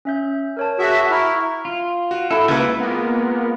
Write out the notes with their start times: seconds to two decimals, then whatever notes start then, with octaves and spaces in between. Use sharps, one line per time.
0.05 C#4 E5 G6
0.57 A#4 C#5 A5
0.79 F#4 G#4 E5
1.10 E4 A#5 C#6 F6
1.65 F4
2.11 F#4
2.31 E4 A4
2.48 C#2 A#3 B4 E5
2.78 G#3 A#3 B3 F4 A#4